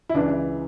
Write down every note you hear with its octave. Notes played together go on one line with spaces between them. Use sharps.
E4
C#2 C#3 E3 D4